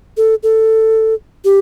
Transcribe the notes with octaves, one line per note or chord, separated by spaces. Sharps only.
A4
A4
G4